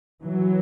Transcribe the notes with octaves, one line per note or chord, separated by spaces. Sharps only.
E3 F#3